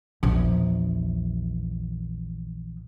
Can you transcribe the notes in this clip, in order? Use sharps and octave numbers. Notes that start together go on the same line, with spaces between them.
A#1 E2